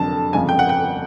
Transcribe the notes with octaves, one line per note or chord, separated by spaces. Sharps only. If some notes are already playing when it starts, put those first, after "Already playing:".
Already playing: F2 D3 F#3 A5
G1 F2 C#3 F3 G#5
G5
F#5
G5